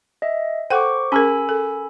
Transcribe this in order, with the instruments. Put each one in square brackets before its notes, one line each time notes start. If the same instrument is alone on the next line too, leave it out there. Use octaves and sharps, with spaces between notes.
[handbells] D#5 E5
[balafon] A4 F#5 G5 [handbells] C5 C#6 D6
[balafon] C#4 G#4 A#4 [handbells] G#5 B5 E6
[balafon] A4